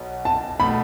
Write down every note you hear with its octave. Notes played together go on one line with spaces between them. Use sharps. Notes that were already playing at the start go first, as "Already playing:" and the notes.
Already playing: B1 B2 F#3 B3
A5
B2 A3 B5